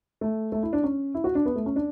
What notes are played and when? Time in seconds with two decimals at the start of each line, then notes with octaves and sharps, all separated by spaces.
0.21 A3
0.52 A3
0.63 E4
0.73 D4
0.84 C#4
1.14 E4
1.24 F#4
1.35 D4
1.45 B3
1.56 A3
1.66 C#4
1.76 D4